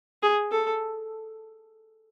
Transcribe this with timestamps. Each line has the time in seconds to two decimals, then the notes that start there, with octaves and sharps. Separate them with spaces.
0.23 G#4
0.51 A4